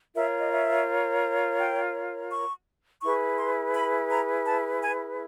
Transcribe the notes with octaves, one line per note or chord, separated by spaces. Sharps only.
F4 A#4 C#5 E5
D#5
E5
G5
C#6
E4 G#4 B4 C#6
C6
B5
A#5
A5
G#5